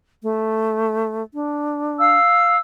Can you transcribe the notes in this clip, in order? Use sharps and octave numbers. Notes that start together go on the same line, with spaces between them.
A3
D4
F5 E6